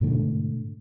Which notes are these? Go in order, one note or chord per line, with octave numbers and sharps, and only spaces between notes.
G#2 B2 D3 A3